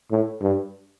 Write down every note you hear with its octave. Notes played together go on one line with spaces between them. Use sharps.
A2
G2